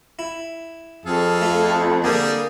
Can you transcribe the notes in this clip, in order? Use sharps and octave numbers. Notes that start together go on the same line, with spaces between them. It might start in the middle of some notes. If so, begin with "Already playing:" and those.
E4
F2 G#4 A4 F5
A3 F4
D3 G3 A#3 G#4